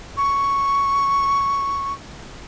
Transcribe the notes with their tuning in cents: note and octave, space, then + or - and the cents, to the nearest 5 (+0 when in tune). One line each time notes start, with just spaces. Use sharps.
C#6 +0